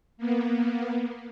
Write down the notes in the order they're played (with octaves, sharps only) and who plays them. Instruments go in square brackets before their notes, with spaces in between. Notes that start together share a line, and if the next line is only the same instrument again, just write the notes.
[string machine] A#3 B3